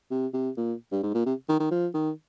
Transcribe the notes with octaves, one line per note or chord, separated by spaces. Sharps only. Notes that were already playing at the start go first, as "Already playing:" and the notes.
C3
C3
A#2
G2
G#2
A#2
C3
D#3
D#3
F3
D#3